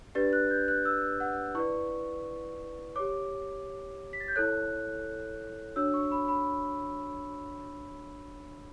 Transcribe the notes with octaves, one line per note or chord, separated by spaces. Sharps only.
D4 G4 B4 D5 A6
F#6
G6
F#6
E6
F#5
E4 B4 D5 C#6
G4 C#5 D6
B6
A6
G6
E4 A4 C#5 F#6
D4 F#4 C#5 E6
C#6
B5
B5